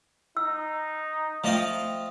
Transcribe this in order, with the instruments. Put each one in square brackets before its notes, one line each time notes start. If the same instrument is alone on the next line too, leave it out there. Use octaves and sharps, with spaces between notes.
[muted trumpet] D#4 [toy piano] E6
[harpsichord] F3 D#5 F5 [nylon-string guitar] A3 G5